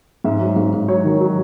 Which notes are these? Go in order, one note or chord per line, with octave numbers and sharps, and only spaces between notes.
G#2 E5
F#3
G#2
G#2
F#3 C#5
D#3
F#3